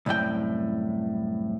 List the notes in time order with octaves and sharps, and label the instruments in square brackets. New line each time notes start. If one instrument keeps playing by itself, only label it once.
[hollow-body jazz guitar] C2 F#2 A2 G5